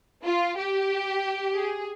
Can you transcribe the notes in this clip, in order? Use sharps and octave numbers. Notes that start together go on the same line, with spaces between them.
F4
G4
G#4